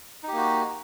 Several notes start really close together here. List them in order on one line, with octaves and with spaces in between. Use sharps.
D#4 G4 A#3 F#4